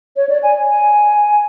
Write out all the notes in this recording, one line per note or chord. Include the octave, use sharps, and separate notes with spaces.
C#5
D5
G#5
G#5